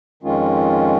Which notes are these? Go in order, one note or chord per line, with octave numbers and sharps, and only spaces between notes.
F2 D#3 G#3 C#4 F4